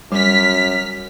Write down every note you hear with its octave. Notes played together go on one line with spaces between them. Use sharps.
F#2 G3 F6 B6